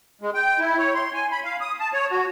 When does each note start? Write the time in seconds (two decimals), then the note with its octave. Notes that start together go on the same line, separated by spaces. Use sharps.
0.21 G#3
0.34 G5
0.60 E4
0.78 C#5
0.95 C6
1.14 G#5
1.32 B5
1.44 F5
1.61 D#6
1.80 A5
1.94 C#5
2.10 F#4